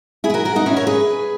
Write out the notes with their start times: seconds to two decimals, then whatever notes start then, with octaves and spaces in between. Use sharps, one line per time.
0.24 E4 G#4
0.30 B4
0.34 F#4 A#4
0.45 F#4 A#4
0.56 D#4 F#4
0.66 C#4 E4
0.77 A#4 C#5
0.87 G#4 B4